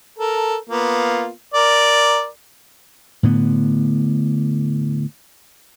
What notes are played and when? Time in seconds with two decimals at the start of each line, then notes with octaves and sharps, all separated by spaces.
0.19 A4 A#4
0.70 A#3 B3 F4
1.54 A#4 D5
3.23 A2 D3 B3